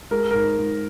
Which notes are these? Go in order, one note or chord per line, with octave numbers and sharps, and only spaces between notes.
G#3 A#4
G#2 A#4
G#2